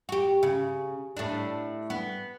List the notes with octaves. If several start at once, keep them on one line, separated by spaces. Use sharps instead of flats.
F#4 G4
C#3
A2 D4
B3